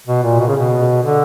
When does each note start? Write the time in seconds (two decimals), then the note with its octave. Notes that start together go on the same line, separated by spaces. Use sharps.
0.07 B2
0.23 A#2
0.40 B2
0.47 C#3
0.57 B2
1.03 D3